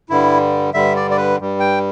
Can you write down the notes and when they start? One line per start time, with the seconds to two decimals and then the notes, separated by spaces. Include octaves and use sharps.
0.10 G2 D3 G3 E4
0.74 G2 D3 G3 E5
0.96 D5
1.11 D5
1.17 B4
1.38 G2 G3
1.60 G5